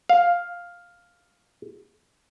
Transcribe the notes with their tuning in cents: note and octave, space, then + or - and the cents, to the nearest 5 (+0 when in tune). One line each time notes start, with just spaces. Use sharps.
F5 +5